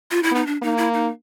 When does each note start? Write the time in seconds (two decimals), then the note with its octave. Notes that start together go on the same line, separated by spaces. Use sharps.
0.11 F4
0.23 E4
0.31 B3 D#4
0.46 D4
0.62 A#3 D#4
0.78 E4
0.94 D#4